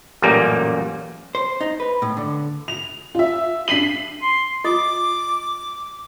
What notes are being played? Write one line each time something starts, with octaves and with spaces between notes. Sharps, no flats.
A1 F#2 A#2 G3 A#3
C5
D#4
B4
A2
D3
F7
F4 E5
D4 B6 C7 D#7 F#7
C6
F4 D#5 D6 D#6